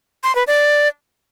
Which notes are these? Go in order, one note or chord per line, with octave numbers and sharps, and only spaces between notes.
C6
B4
D5